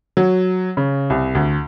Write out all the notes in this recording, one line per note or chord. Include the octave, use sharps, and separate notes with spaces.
F#3
C#3
C2
D2